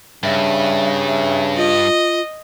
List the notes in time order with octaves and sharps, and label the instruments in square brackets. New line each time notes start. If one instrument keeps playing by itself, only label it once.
[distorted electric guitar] G2 [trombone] C#3 [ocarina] E5
[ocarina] E5
[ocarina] F4 [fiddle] D#5